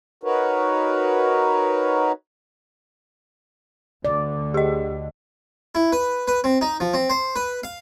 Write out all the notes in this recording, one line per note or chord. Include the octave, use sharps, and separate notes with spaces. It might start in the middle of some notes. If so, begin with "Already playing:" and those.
D#4 F#4 A#4 B4 C#5
D2 D3 D5
G4 G#4 D#5
E4
B4
B4
C4
D#4
F3
C4
C5
B4
F5